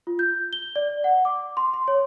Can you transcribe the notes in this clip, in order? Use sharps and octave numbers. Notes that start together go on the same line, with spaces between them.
F4
G6
G7
D5
F#5
D6
C6
C6
C#5